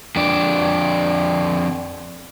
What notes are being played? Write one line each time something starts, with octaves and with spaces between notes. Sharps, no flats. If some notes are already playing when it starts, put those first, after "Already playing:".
F2 D4